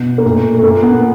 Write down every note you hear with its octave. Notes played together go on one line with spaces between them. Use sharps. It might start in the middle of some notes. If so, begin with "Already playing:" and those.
Already playing: B2
A#3
A#2 A3
A3
A#2 A#3
B3